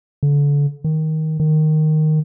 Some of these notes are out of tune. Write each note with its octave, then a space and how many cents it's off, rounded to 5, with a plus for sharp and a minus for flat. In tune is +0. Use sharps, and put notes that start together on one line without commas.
D3 -30
D#3 +15
D#3 -5